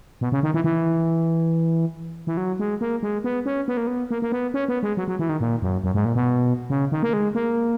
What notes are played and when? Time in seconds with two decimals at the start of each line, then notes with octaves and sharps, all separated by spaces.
0.21 B2
0.32 C#3
0.43 D#3
0.54 E3
0.64 E3
2.27 E3
2.37 F#3
2.59 G#3
2.81 A#3
3.03 G#3
3.24 B3
3.46 C#4
3.68 B3
3.77 A#3
3.87 B3
4.11 A#3
4.22 A#3
4.32 B3
4.54 C#4
4.68 B3
4.83 G#3
4.97 F#3
5.08 F#3
5.19 E3
5.29 D#3
5.41 A#2
5.62 F#2
5.84 F#2
5.95 G#2
6.05 A#2
6.15 B2
6.70 C#3
6.92 D#3
7.03 A#3
7.13 G#3
7.35 A#3